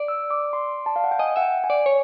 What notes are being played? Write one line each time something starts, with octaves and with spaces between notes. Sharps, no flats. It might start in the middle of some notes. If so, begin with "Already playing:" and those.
Already playing: D5
E6
D6
C6
A5
F5
F#5
G5
D#5 G#5
E5 F#5
G5
G#5
D5
C#5 G#5